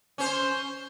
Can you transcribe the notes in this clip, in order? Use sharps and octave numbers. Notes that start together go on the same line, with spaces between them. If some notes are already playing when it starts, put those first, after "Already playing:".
C#4 C5